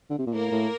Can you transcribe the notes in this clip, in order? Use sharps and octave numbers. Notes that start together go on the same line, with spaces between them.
D3
C3
A#2
A2 A#3 A#4
A2